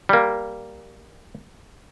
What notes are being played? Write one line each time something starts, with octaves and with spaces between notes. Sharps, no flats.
G3 A#3